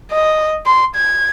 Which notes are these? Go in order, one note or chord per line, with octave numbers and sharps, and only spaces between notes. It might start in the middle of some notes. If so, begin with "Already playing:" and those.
D#5
C6
G#6